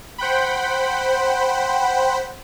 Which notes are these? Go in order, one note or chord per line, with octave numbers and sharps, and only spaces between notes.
C5 F#5 G5 B5